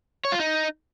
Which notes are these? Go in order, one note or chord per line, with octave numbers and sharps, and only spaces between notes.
C#5
F4
D#4